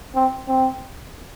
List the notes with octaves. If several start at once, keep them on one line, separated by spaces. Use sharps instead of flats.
C4
C4